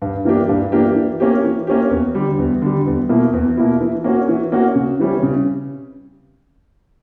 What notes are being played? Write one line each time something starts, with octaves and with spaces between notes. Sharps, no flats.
G2
E3 A#3 D4 G4
G2
E3 A#3 D4 G4
E3
A#3 C#4 G4
E3
A#3 C#4 G4
E2
D3 G3
E2
D3 G3
E2
B2 A#3 E4
E2
B2 A#3 E4
E3
A#3 C#4 F#4
E3
A#3 C#4 F#4
C#3
E3 G3 C#4
C#3